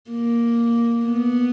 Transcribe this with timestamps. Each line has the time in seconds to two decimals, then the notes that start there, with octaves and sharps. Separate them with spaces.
0.11 A#3
1.06 B3